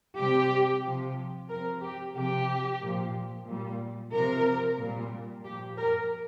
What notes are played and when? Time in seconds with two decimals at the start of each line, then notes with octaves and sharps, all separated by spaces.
0.17 C3 G3 G4
0.84 C3 F3
1.49 C3 F3 A#4
1.82 G4
2.15 C3 F3 G4
2.81 A#2 F3
3.47 A#2 G3
4.13 C3 F3 A#4
4.78 A#2 G3
5.44 A#2 F3 G4
5.77 A#4